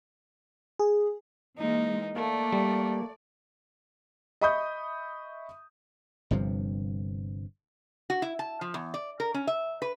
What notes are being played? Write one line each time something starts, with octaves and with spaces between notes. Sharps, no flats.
G#4
E3 G#3 A#3 D#4
A3 A#3 D5
G3
D#5 E5 B5 C#6 D#6 G6
G1 G2 C3 F3
F#4
E4
A5
F3
E2
D5
A#4
C#4
E5
B4